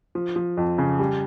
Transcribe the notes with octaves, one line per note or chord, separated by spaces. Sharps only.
F3
F3
F2
C#3
G3